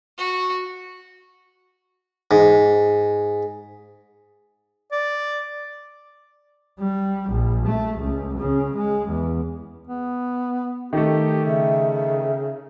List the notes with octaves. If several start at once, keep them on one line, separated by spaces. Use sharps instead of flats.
F#4
G#2
D5
G3
A#1
A3
C#2
C#3
G#3
E2
B3
D#3 A3 G4
C#3 E5